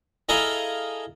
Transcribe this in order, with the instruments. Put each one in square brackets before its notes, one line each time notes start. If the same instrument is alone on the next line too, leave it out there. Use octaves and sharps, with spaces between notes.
[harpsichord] E4 G#4 A4 D#5 F5 A#5